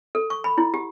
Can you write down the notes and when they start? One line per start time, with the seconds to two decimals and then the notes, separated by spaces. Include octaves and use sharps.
0.15 A4
0.30 C#6
0.44 B5
0.58 E4
0.74 G4